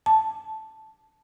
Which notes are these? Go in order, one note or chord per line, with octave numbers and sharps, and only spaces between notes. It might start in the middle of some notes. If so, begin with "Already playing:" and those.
A5